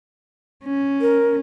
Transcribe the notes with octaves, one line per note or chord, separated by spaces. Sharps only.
C#4
A#4